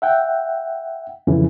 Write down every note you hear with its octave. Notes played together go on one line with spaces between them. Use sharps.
E5 F#5 G5
F2 C#3 E3